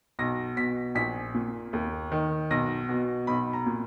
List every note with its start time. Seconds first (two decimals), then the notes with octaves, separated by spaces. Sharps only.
0.19 B1 A#6
0.57 B2 B6
0.95 A#1 B6
1.34 A#2
1.73 D#2
2.12 D#3
2.50 B1 A#6
2.89 B2
3.27 B1 B5
3.53 A#5
3.66 A#2